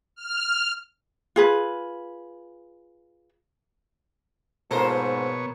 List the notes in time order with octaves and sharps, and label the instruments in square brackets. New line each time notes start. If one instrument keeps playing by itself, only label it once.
[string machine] F6
[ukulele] F4 G#4 B4
[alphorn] G#2 [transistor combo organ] B2 C#5 [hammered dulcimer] F3 A#3 [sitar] A4 A#4 C5